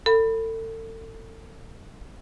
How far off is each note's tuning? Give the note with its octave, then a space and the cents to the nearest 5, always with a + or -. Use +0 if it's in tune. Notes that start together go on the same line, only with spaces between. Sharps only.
A4 +35 B5 +0